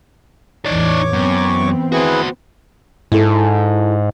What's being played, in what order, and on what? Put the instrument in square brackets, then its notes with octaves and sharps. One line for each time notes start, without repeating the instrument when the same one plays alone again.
[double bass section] A1 E2 E3 [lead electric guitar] D#4 D5 [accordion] C#5 C#6 D6
[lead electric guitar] F#2 [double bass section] E3 B3 C4
[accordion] E4 G#4 B4 [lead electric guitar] F#4 C5
[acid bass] G#2 [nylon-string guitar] E4 A4